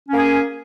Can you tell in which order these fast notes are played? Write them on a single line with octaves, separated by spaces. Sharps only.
C#4 A#3 G#4